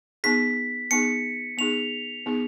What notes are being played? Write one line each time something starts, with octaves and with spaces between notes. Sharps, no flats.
B3 D#4 G#4 B6
B3 D#4 G#4 C#7
B3 D#4 G#4 F7
B3 D#4 G#4